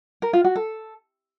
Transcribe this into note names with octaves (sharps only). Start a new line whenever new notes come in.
A#4
F4
F#4
A4